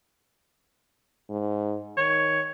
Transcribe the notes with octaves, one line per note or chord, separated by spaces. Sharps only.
G#2
D#3 C#5